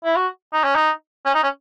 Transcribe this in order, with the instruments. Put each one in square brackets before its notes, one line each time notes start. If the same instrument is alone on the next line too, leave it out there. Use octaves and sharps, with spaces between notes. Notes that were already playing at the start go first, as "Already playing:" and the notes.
[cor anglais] E4
F#4
D#4
C#4
D#4
C#4
D#4
C#4